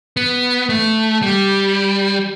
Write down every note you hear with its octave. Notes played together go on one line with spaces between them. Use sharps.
B3
A3
G3